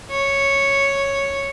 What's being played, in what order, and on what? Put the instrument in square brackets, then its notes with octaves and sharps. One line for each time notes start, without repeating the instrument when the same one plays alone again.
[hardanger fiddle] C#5